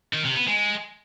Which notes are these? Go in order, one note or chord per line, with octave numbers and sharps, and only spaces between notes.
D#3
C3
B3
G#3